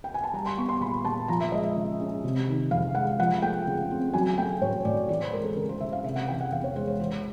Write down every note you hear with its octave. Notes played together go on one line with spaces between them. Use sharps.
G5
G#5
A5
G3 A#5
C6
B3 C#6
C6
A#2 B5
A#2 A5
F3 A#5
E5
G#3 D#5
E5
C#3
C#4
C3
D#3
F2 F5
G#3 F#5
F3 F#5
A3 G5
C#3
C4
F#3 G#5
A3 G5
A2 C#5
A2 D5
E3 D5
C5
G#3 A#4
A4
C#3 A#4
C5
C#3 E5
F5
C3 E5
F#5
E3 G5
F#5
E2 F5
C#5
G#3 C5
C#5
E3 C5